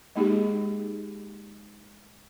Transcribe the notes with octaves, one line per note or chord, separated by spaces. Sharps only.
G#3 A#3 D#4 G4 G#4